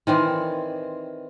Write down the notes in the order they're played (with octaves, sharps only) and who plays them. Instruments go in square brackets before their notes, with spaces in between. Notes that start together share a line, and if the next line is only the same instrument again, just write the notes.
[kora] D#3 E3 C4 D5